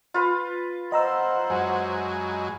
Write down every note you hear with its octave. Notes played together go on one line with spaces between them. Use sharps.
F4 B4
C5 D#5 F#5 A#5 E6
F#2 G#3